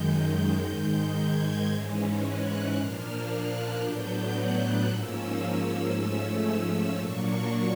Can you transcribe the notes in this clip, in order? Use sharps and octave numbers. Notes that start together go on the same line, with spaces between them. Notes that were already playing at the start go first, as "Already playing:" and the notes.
Already playing: F#2 D#3 G#3 G6
G#2 D#3 G#3
G#6
G#2 E3 G#3 C#4
F#6
A#2 F3 A#3 D4 F6
F#6
A2 F#3 B3 D4 G6
F#6
G#2 F3 A#3 C#4 E6
G#2 F3 A3 C#4
E6
A#2 F#3 A#3 D4 C#6